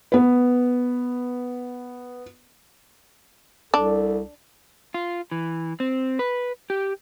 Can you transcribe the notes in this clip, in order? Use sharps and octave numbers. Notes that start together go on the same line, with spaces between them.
B3 B4
C2 D4 A4
F4
E3
C4
B4
G4